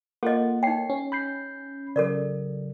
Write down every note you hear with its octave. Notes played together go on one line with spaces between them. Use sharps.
A#3 F4 A4 D#5 F#5
D#4 C#5 G5 C7
C#4
B5 G6 C7
C#3 F#3 A4 A#4 D5